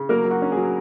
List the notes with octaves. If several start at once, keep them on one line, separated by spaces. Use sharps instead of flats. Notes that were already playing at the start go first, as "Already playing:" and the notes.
Already playing: C#3
F#3 A#3 A#4
F#3
F#4
C#4
G#4
F#3